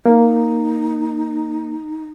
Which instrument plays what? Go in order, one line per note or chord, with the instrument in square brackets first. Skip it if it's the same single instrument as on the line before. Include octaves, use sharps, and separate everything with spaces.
[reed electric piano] A#3 [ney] D#4